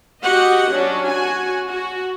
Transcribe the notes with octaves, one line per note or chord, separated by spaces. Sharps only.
F#4 G4 D#5 F#5
F#3 C#4 D4
F#4 G#5
F#4